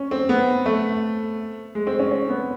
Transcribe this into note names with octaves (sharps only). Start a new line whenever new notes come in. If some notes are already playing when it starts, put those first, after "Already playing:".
Already playing: C#4
C4
B3
A3
G#3
C4
C#4
C#4
B3